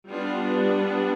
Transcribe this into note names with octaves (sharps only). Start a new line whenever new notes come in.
G3 B3 D4 F4